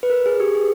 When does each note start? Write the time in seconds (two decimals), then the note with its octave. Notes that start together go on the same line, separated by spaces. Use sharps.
0.03 B4
0.10 A#4
0.26 G#4
0.40 G4
0.55 G#4